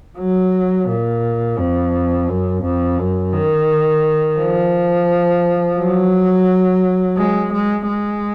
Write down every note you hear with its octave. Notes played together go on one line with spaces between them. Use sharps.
F#3
A#2
F2
F#2
F2
F#2
D#3
F3
F#3
G#3
G#3
G#3